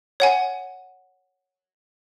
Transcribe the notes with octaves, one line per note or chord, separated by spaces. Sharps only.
C#5 F#5 G#5